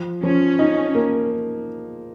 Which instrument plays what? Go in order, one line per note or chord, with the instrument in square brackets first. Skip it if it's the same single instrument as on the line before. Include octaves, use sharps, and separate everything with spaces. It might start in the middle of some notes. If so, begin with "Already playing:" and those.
Already playing: [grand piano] F3
[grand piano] F3 [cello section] C#4
[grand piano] D#4
A#3